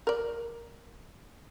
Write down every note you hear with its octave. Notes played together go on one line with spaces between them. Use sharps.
A#4 D5